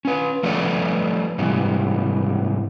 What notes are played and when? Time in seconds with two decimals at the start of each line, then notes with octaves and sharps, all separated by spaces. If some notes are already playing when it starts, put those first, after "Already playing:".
0.05 C#4 B4
0.43 F3 A3 A4 B4 C#5 D5
1.38 G#2 C3 E3 G3